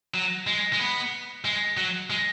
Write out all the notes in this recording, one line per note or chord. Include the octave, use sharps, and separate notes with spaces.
F#3
G#3
G#3
B3
G#3
F#3
G#3